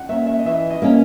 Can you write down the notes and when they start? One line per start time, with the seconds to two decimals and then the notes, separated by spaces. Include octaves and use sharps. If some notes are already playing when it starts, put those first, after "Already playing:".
Already playing: F#5
0.09 A#3 C#4 E5
0.26 E5
0.39 D#5
0.45 E3 E5
0.70 D#5
0.82 A#3 C#4